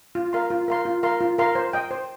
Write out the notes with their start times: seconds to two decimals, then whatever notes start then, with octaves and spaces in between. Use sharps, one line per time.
0.15 F4
0.33 A#4 F5 C6
0.50 F4
0.68 A#4 F5 C6
0.85 F4
1.03 A#4 F5 C6
1.20 F4
1.38 A#4 F5 C6
1.55 C5
1.73 D#5 G5
1.91 C5